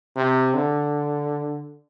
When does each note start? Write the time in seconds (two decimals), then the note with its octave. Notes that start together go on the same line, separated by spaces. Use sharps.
0.16 C3
0.54 D3